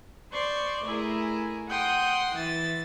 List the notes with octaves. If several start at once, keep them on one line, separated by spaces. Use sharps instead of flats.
C5 D5 C6 C#6
A3 E4 G#4 A#4
F#5 G5 C6 D#6
E3 E6 A6